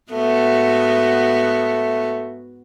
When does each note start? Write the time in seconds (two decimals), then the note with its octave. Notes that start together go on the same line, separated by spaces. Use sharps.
0.12 G#2 A3 B3 F#4